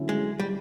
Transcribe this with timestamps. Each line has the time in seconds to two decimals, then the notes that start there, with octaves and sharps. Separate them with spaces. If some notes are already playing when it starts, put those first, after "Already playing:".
Already playing: D3 F#3 A3 C#4 E4
0.09 G#3
0.40 G3